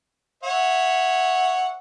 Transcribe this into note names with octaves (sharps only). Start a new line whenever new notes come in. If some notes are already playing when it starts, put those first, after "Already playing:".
C#5 E5 F#5